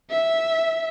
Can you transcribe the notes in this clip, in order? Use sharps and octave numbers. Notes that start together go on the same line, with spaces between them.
E5